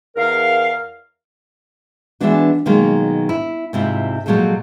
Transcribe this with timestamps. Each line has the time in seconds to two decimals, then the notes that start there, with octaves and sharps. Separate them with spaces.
0.16 E2 A#4 F5
2.20 E3 F3 G#3 B3 D4 F#4
2.65 B2 D#3 F#3 G#3 A#3
3.29 E4
3.73 G#2 C3 E4 F4
4.26 A#2 F3 F#3 G#3 G4 A4